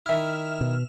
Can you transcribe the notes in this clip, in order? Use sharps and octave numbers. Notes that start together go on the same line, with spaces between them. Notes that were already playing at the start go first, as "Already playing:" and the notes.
D#3 E4 E5 F6
B2